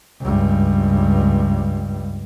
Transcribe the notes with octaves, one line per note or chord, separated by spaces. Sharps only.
C#2 G2